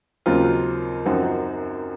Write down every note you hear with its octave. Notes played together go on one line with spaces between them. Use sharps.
D#2 C#3 F#3 C4 F4
F#2 F3 C4 D#4 F#4